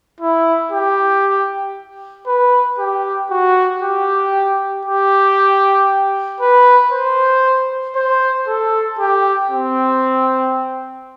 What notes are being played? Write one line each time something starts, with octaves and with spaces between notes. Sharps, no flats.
E4
G4
B4
G4
F#4
G4
G4
B4
C5
C5
A4
G4
C4